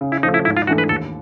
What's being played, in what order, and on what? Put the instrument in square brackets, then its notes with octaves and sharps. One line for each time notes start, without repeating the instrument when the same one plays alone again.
[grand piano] C#3
[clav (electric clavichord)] E4
[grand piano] F3 [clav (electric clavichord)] D#4
[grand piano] A3
[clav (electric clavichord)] E4
[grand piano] G#2 [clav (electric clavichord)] E4
[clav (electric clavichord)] F4
[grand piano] E3 A3 D4 [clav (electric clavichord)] F#4
[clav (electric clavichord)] B4
[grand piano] D#2 [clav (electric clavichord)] A4